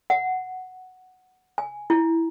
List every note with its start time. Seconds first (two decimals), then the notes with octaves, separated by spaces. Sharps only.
0.10 F#5
1.58 G#5
1.90 E4